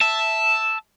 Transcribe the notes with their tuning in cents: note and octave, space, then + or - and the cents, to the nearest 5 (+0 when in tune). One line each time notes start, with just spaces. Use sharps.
E5 +0 A5 +0